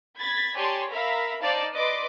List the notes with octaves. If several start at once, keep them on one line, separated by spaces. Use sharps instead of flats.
B5 G#6 A6 B6
G4 C#5 D5 G#5 A5 C6
A#4 E5 F5 A#5 B5
D#4 C5 D5 F5 A5
B4 D5 D#5 C6 D6